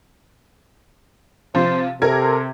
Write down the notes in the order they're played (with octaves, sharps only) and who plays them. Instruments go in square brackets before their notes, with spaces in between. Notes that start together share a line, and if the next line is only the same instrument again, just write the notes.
[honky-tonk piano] C3 F3 [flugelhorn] C5
[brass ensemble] C3 [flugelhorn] A4 [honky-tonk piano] A#4 G#6